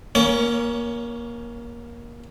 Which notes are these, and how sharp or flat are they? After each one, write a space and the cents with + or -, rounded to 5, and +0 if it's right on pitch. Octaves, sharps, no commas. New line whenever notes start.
A#3 +20 C#4 +0 C#5 +25